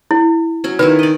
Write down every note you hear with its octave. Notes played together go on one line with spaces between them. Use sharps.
E4
F#3 C#4
D#3 D#4 E4 B4
D5 D#5